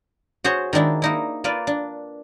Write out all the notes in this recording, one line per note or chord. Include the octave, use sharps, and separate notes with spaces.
F#4 G#4 C5 C#5
D#3 G#3 D4 E4
A#3 D#4 E4
A#3 F4 B4 D5
D4